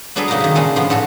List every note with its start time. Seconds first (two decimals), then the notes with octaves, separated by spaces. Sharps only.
0.16 F#3 B3 D4 G#4 A4 B4
0.28 C#3 A#3 D#4 F#4 A#4 A#5
0.40 C3 D#3
0.55 A#2 C#3 G#3 A4
0.76 A2 F3 B3 D4
0.90 G#2 F#4 A4 C#5